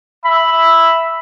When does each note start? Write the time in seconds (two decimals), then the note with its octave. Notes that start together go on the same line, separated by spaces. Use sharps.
0.25 E5 B5